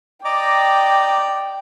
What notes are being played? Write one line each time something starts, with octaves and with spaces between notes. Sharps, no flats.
D5 D#5 G5 A#5 D6